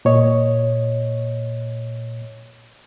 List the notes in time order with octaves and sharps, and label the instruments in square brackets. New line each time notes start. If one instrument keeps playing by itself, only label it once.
[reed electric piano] A#2 C#5 D#5